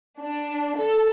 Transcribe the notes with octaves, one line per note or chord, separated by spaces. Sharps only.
D4
A4